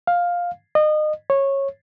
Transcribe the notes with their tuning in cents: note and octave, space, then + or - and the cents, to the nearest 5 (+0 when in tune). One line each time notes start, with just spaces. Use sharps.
F5 +10
D#5 -30
C#5 -15